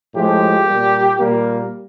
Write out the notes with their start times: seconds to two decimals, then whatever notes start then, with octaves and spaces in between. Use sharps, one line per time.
0.15 A2 F3 G#3 G4
0.66 A#2 G3 A#3
1.19 A#2 G3 A#3